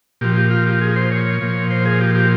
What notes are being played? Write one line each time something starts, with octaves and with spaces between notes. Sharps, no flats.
A#2 F3 G4
G4
F4
G4
G#4
C5
C#5
A#2 F3
C5
G#4
G4
G4